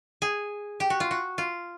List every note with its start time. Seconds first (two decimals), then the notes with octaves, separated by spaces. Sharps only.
0.22 G#4
0.80 G4
0.90 F#4
1.00 F4
1.11 F#4
1.38 F4